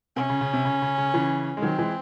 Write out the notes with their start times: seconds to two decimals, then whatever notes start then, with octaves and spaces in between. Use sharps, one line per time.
0.16 C3 C#4
0.30 C#3
0.41 C#3
0.53 C3
0.65 C#3
0.82 C#3
0.98 C#3
1.14 C#3 E3
1.57 G#3
1.62 D#3 F#3 C4
1.78 E3 G#3